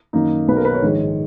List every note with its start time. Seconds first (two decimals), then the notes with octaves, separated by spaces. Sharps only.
0.13 F#2 D#3 A#3 D#4
0.48 B1 B2 A#3 C#4 B4
0.56 A#4
0.65 B4
0.74 C#5
0.82 A#1 G#2 D#3 G#3